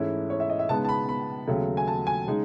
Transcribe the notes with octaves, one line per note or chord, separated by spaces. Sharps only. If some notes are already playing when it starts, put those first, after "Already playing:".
Already playing: G#2 E3 A3 C#4 E4
C#5
E5
D#5
E5
C#3 G#3 B3 D#4 A5
A5
B5
B5
D#2 C#3 F#3 A3
G#5
A5
G#5
C#3 G#3 D#4